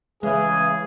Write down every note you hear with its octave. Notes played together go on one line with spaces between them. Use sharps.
C#3 E3 G#3 G#4